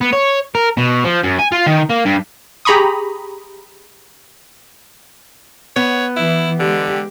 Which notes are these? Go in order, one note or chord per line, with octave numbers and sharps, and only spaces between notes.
B3
C#5
A#4
B2
F3
F#2
G#5
F4
D#3
A#3
G2
G4 G#4 A#5 B5 C#6 D#6
B3 C#5
E3 E4
D3 G#3 G4